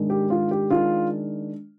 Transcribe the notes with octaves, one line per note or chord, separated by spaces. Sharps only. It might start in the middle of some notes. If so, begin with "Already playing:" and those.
Already playing: G#2 D#3 G#3 D4
G4
F4
G4
D#3 G#3 D4 F4